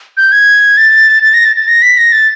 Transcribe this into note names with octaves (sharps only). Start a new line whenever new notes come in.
G6
G#6
A6
A6
A#6
A6
A6
A#6
B6
A#6
A6